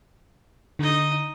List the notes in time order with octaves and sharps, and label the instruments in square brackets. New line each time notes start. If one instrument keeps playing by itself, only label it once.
[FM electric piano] D3 [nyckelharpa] D#4 D#5